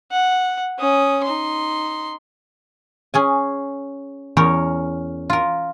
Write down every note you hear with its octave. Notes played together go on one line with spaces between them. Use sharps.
F#5
C#4 D#6
D#4 C6
C#4 G#4 G#5
E2 C#4 A#4 C#5
F4 A#4